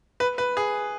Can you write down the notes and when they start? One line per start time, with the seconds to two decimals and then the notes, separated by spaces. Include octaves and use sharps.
0.20 B4
0.38 B4
0.57 G#4